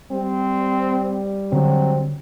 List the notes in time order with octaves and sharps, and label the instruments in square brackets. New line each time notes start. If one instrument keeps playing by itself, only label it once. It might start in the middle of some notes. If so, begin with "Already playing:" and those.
[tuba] G3 [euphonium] C4
[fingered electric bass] D3 [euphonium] F#3 [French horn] C4